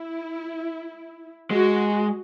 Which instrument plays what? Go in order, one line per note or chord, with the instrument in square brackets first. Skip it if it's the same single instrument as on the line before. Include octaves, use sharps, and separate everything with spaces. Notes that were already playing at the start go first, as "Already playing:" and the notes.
Already playing: [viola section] E4
[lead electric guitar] G#3 [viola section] F#4